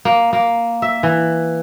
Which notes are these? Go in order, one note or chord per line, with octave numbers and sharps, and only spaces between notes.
A#3
A#3
E5
E3